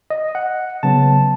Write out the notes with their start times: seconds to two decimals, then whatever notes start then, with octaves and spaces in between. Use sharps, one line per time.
0.10 D#5
0.35 F#5
0.83 C#3 F#3 B3 A5